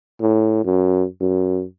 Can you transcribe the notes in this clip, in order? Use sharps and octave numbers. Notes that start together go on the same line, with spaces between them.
A2
F#2
F#2